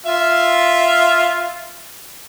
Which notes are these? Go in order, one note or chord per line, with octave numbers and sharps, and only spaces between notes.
F4 E5